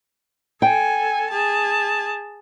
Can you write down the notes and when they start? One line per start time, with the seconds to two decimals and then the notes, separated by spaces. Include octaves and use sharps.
0.62 A4 G5 G#5
1.30 G#4 A5